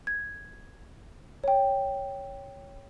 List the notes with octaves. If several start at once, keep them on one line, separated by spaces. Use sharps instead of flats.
G#6
C#5 G5